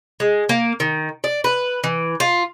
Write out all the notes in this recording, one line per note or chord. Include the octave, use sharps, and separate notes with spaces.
G#3
A#3
D#3
D5
B4
E3
F4